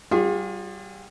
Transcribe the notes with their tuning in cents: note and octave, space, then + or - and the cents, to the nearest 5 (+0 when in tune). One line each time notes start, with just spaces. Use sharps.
G3 -35 F4 +25 G#4 -40